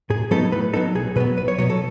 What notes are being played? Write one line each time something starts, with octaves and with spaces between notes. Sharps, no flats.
A2 G#4
F#3 B3 D#4 A4
A2 B4
F#3 B3 D#4 A4
B1 G#4
B2 F#3 B3 B4
B1 B4
C#5
B2 F#3 B3 C#5
A4